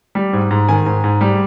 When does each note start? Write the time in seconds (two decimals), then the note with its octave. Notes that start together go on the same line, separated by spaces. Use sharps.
0.15 G3
0.33 G#2
0.51 G#2
0.69 D#3 G#5
0.86 G#2
1.04 G#2
1.21 G3